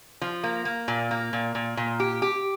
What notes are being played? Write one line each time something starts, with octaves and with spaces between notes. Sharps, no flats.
F3
A#3
A#3
A#2
A#3
A#2
A#2
A#2
G4
G4